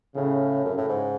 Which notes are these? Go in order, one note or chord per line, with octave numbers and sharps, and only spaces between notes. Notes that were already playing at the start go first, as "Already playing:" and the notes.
A2 C#3
F#2 C#3
A2
G#2